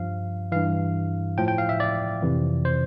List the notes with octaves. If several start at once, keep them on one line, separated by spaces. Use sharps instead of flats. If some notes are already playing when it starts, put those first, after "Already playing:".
Already playing: G2 F3 F5
G2 E3 F5
A2 F3 G5
G5
F5
E5
D5
F2 C3 E3
C5